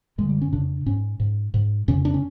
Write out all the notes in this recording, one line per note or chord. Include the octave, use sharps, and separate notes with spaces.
F#2 D3 G#3
G3
C#4
F2 C#3 D4
G#2 C#4
G#2
G#2
F2 C#3 C#4
D4
C#4